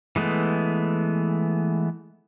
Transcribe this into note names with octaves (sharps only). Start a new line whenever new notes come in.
E3 G#3 A3 B3